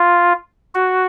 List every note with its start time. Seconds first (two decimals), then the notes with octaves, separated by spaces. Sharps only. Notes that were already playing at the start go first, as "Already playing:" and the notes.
Already playing: F4
0.75 F#4